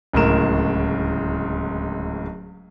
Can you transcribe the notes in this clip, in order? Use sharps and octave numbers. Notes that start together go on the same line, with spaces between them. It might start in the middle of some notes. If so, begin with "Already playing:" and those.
D1 C#2 A2 A#4 E7